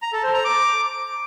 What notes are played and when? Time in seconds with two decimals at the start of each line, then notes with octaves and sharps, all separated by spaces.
0.02 A#5
0.13 A4
0.23 C5
0.34 A#5
0.45 D6